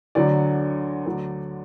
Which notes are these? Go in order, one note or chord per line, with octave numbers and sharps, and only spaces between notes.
D2 D3 F#3 D5
D2 D3 F#3